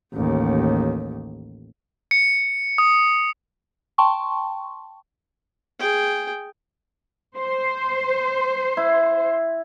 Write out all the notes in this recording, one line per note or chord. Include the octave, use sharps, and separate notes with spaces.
A1 D#2
C#7
D#6
G5 A5 C6 C#6
G#4 G5
C5
E4